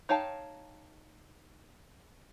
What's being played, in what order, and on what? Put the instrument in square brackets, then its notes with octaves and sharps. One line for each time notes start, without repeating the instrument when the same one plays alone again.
[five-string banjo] D#4 C#5 F5 G5 A5